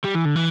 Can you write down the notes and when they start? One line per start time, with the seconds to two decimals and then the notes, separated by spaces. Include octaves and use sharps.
0.05 G3
0.15 E3
0.25 D3
0.36 E3